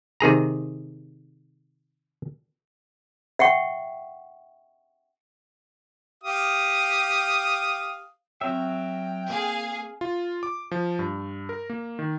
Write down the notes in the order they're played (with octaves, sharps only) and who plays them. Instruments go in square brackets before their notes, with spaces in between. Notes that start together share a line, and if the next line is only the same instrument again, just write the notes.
[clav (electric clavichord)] C3 D#3 G#4 A#5
[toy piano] E5 F#5 G5 C#6
[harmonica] G4 F5 D#6
[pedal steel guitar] F#3 A#4 E5 [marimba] C4 C#5 [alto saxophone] G5
[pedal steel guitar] A#3 [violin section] G#4 F5
[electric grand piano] F4
D6
F3
G2
A#4
A#3
D#3